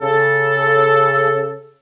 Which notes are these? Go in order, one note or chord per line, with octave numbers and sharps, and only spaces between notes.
C#3 A4